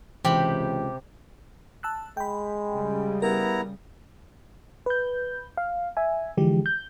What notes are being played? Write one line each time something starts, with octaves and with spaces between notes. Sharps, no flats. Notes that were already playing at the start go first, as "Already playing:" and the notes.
C#2 C3 E3 G4 B5
A5 E6 F#6
G#3 G5 B5
C#3 G3
B3 E4 A#4 A#5
B4 G6
F5
E5 G#5
D3 E3 F3 G#3 G4
G6